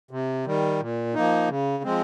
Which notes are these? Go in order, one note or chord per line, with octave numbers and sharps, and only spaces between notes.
C3
D#3 G3
A#2
F3 A#3 D#4
C#3
F3 G#3 C4